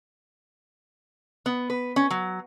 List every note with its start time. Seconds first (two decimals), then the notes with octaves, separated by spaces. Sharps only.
1.46 B3
1.70 B4
1.96 C#4
2.11 F#3